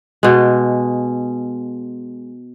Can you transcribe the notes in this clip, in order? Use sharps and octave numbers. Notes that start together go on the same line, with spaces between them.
B2 G#3